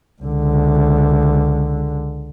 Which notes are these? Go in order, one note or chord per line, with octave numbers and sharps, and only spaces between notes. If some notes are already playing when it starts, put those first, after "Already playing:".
C#2 D3